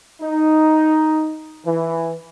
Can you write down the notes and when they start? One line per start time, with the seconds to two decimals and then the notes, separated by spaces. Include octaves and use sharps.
0.22 D#4
1.66 E3